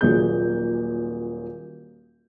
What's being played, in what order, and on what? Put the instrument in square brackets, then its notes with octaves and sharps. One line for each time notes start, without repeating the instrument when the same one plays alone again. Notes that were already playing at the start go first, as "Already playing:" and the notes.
[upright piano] D#1 A#2 F#3 G#4 G6